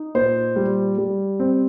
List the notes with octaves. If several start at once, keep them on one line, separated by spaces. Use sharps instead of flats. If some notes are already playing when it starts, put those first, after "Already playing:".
Already playing: D#4
A#2 C5
G3
G3
C4